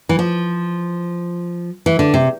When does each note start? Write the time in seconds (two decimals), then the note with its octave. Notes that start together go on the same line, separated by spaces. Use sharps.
0.09 E3
0.19 F3
1.86 E3
1.99 D3
2.14 C3